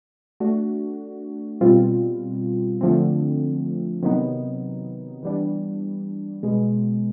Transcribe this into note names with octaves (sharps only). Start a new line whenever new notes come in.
A3 D4 F#4
B2 G3 C4 F4
D3 F3 A3 C4
C3 D#3 F#3 B3 D#4
E3 G3 B3 D4
B2 G#3 B3